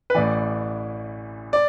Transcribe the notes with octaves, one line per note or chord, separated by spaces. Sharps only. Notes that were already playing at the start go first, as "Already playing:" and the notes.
B4
A1 A2 E3 D5
D5